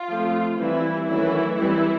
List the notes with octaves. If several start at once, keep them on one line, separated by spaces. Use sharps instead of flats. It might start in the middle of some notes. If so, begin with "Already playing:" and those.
Already playing: F4
F3 A3 C4
E3 G3 C4 E4
D#3 E3 F#3 A3 C#4 E4
E3 G3 C4 E4